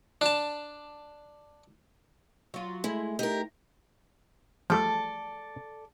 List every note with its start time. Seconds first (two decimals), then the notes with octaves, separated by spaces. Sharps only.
0.21 D4 A5
2.54 F#3 F4
2.84 G#3 A3 E4
3.19 D#4 G4 A#4
4.70 F3 G3 A3 A4 D5